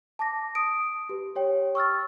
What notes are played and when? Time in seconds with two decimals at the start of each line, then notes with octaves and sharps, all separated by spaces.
0.19 A5 D6 A#6
0.55 D#6 D7
1.09 G4 B4
1.36 G4 C#5 G5
1.75 C#6 E6 F6 A6